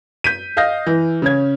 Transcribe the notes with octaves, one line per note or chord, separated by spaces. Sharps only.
G6 B6 D#7
D#5 F5 D#6 F6 G6 A#6
E3
C#3 C#4 G#6